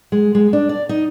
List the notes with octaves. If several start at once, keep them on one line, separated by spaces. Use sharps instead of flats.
G#3
G#3
D4
D5
D#4